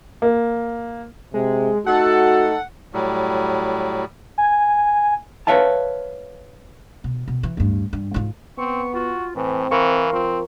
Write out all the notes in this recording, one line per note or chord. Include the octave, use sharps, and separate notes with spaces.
A#3
C3 G#3
A3 D#4 F#4 A4 F#5
A2 F#3 G3
G#5
B4 C#5 E5 F5 A5
B2
B2
E3
D1 G2
G2
G#2 F4
B3 C4 C#6
F4 F#4
A2 E3 C4
E3 A#4 F5 C6 C#6
F3 C4